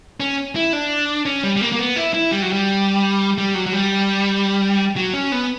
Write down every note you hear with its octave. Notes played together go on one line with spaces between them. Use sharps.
C#4
E4
D4
C#4
G3
G3
A#3
A#3
B3
E4
E4
G3
F#3
G3
G3
F#3
F#3
G3
F#3
C#4
B3